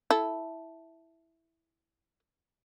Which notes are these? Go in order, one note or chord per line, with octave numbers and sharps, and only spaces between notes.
E4 A4